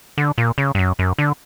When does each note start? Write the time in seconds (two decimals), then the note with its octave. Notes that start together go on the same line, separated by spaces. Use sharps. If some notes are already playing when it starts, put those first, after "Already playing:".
0.18 D3
0.38 A#2
0.58 C#3
0.75 G2
0.79 F#2
0.99 F#2
1.18 D3